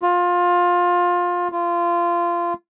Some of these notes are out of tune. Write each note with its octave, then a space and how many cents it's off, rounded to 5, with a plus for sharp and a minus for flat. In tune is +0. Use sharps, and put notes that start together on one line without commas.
F4 +20
F4 -20